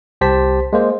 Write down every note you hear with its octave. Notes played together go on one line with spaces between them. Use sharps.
C2 G4 C5 A5 B6
G#3 A#3 C5